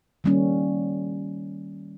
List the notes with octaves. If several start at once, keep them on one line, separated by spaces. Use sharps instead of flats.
D#3 G3 A#3 C#4